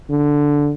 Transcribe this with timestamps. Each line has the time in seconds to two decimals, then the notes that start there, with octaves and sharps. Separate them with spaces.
0.11 D3